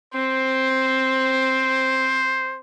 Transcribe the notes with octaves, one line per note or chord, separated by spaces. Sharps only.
C4 C5